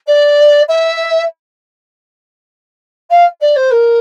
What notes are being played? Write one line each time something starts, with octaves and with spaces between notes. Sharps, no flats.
D5
E5
F5
D5
C5
A#4